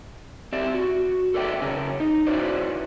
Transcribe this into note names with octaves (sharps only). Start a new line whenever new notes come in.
C4 G4 D5 E5
F#4
A4 B4 D5 E5 G5
C#3 C#4 G#4 A#4
D#4
C#4 E4 F#4 B4 C5 D5